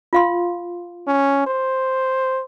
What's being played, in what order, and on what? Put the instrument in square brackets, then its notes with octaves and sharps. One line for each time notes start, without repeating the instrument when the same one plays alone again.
[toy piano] F4 F5 C6
[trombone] C#4
C5